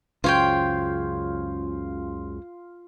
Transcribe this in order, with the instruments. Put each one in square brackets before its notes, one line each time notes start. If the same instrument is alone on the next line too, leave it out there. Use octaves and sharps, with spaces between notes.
[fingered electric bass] C#2 F#2 C#3 [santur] F4 [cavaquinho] C5 C#5 G5